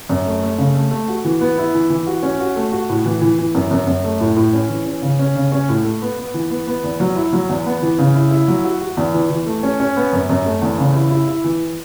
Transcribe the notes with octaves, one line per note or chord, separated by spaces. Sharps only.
F#2
A3
A3
C#3
A3
A3
F#4
E3
B3
E4
E3
E3
F#4
C#4
F#4
A3
F#4
A2
E3
E3
E3
F#2
F#2
F#2
A3
A2
A2
C#4
E3
C#4
C#3
C#4
C#3
C#4
A2
A3
B3
B3
E3
B3
B3
E2
F#3
E4
F#3
E2
B3
E3
C#3
E4
E4
F#3
F#4
F#4
E2
E3
E3
A3
C#4
C#4
B3
F#2
F#2
A3
E2
C#3
E4
E4
E4
E3